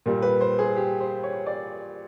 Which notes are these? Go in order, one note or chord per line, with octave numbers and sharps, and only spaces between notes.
A#2 G3 A#3
B4
C5
G#4
G4
C5
C#5
D5